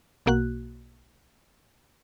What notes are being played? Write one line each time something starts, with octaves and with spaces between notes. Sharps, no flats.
B1 B2 A#3 F#4 F#6